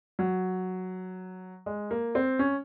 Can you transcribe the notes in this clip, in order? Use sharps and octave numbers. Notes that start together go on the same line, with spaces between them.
F#3
G#3
A#3
C4
C#4